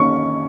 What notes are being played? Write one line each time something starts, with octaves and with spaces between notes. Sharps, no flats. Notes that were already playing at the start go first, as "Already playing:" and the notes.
Already playing: D#3 A#3 C#4 C#6